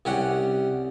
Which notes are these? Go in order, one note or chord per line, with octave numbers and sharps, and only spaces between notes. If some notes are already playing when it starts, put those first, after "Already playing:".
C2 C#4 G4 F#5